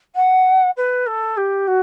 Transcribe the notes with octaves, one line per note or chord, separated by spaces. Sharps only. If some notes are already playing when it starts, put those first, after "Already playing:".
F#5
B4
A4
G4
F#4